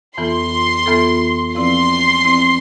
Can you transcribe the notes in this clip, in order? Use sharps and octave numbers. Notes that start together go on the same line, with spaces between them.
F2 E3 B3 F4 A4 C6
F2 E3 B3 F4 A4
F3 C4 E4 B4 D5 C6
F3 C4 E4 B4 D5